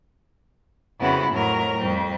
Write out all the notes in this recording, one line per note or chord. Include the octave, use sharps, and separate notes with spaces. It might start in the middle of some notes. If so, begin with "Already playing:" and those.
F2 C#3 B3 E4 F#4
F2 A2 F#3 A#4
F2 G3 C4